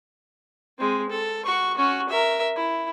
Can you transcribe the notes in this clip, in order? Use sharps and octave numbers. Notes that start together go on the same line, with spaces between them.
G#3 C4
A4
F#4 C#6
C#4 F#4
A#4 E5
E4